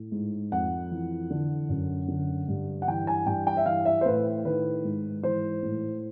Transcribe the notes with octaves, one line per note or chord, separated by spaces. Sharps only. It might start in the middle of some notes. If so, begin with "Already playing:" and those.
Already playing: A2
G#2
F2 F#5
E3
D3
F#2
D3
G2
F#5
E3 G5
G#5
G2 G5
G5
E5
E3 F5
E5
C5
A2 B4
D#3 B4
G#2
E3 C5
A2